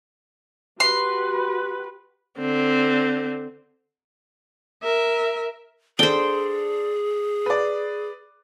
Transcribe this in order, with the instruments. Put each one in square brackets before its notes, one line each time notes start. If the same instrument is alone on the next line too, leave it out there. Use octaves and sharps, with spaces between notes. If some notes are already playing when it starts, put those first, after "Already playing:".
[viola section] F#4 G4 B4 [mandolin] C6
[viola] D3 C4
A#4 E5
[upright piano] D4 A4 [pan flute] G#4 [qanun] C5 G5
[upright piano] B4 D5